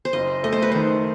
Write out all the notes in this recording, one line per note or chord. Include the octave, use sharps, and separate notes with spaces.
C5
F#1 D#5
A3 D#5
C5
B4
D#3 C5